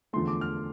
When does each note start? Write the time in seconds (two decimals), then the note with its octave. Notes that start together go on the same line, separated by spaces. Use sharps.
0.13 E2 D3 F3 A3 C6
0.28 D6
0.41 F6